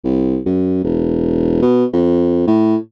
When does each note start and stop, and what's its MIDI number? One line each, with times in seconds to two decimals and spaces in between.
0.04 0.39 36
0.46 0.80 42
0.84 1.57 28
1.62 1.85 47
1.93 2.47 41
2.47 2.77 45